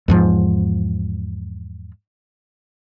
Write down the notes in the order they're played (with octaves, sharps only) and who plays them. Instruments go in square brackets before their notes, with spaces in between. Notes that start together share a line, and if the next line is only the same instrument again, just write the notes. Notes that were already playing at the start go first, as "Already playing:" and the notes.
[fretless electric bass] E2 G#2 F3